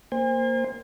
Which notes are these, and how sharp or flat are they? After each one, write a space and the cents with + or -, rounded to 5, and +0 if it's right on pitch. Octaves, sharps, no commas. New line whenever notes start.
A#3 -5 C5 +0 G#5 -45